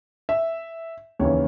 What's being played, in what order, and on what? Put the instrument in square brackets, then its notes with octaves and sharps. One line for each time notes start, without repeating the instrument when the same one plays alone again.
[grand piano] E5
D#2 C#3 E3 C#5